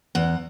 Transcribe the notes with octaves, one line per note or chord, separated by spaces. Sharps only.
E2 F#5